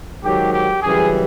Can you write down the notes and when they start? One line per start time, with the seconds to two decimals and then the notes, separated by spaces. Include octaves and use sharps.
0.23 G#2 D#3 F#3 G4
0.53 G4
0.82 F#2 C#3 E3 G3 G#4